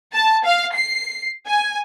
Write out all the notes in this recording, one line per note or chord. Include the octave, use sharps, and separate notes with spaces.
A5
F5
C7
G#5